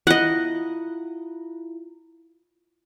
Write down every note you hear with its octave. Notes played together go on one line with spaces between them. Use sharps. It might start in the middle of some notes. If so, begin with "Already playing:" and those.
E4 F4 D#5 F#5